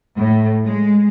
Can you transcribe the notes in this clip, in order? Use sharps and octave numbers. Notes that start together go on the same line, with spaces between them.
A2
G#3